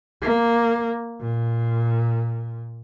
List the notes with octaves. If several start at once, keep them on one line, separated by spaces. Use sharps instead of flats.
A#3
A#2